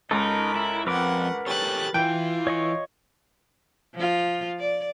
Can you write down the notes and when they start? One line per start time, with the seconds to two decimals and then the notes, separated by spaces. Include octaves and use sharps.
0.11 C#2 D#4 A4 A#4 B5
0.56 E4
0.87 F2 A#4 B4 F#5 D6
1.47 G4 A4 C#5 F#6 A6
1.94 E3 F4 G5
2.47 C#5 D#5 C#6
3.95 F3 F4
4.59 D5